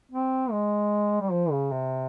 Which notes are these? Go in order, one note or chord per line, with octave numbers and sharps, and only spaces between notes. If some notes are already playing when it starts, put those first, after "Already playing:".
C4
G#3
G3
F3
C#3
C3